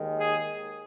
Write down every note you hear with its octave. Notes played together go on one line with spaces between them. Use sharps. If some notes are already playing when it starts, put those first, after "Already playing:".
Already playing: D#2 D#3 G#3
G#4